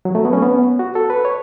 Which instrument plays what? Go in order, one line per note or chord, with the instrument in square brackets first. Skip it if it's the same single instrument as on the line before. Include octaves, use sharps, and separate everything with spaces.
[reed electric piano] F#3
A3
B3
C#4
B3
F#4
A4
B4
C#5